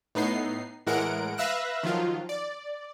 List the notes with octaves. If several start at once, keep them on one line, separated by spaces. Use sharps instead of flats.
A2 B3 D#4 C7
A2 E3 G#3 A#4 F#5 D7
B4 E5 F5 E6 F#6 A#6
D#3 F3 F#3 F4
D5